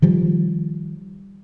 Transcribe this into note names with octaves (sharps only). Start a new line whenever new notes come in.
D#3 F3 G3